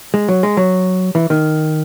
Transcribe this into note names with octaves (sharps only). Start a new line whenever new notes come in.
G#3
F#3
G#3
F#3
E3
D#3